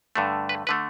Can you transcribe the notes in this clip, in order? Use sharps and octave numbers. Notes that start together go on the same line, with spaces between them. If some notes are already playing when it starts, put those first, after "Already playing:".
G2 D3 A3
B4
D3 A3 B4